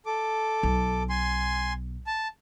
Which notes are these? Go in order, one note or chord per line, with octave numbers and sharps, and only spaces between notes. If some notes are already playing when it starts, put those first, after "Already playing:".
A4 D6
B1
G#5 C6
A5